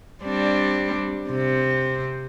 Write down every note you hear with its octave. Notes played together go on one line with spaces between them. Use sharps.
G3 C4 D4
C3 C4